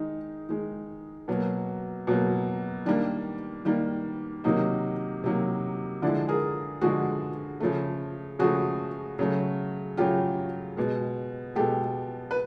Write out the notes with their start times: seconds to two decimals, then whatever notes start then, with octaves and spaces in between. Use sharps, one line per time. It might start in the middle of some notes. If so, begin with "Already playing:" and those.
Already playing: D#3 G#3 D#4
0.49 D#3 G#3
1.28 B2 F#3 A#3
2.07 B2 F#3 A#3
2.86 D#3 G3 A#3 D4
3.65 D#3 G3 A#3
4.44 C3 D#3 F#3 A#3 D#4
5.24 C3 D#3 F#3 A#3
6.02 D3 F3 G#3 D4 E4
6.28 G#4 A#4
6.81 D3 F3 G#3 F#4 G#4
7.60 C#3 F3 A3
8.39 C#3 F3 A3 F#4 G#4
9.19 C#3 F#3 A3
9.97 C#3 F#3 A3 F4 G4
10.77 B2 G#3
11.56 B2 G#3 G4 A4
12.31 B4